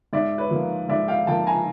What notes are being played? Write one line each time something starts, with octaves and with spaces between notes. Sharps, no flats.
G#2 D5 E5
B4 C#5
F3 A#3
G#2 D5 E5
F5 G5
F3 A#3 G5 A5
G#5 A#5